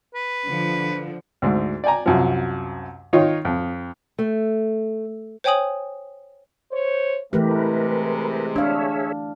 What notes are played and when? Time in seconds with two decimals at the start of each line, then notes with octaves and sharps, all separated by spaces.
0.15 B4
0.46 D3 F3
1.42 D2 G#2
1.84 D5 G5 G#5 A#5
2.06 C2 F#2 F3
3.13 D#3 D#4 F4 C#5
3.45 F2
4.19 A3
5.44 C5 C#5 G5 G#5 D#6 F#7
6.71 C5 C#5
7.33 C3 E3 G#3 A3 G4 A#4 B4
8.56 D4 G#4 C#5 E5 F5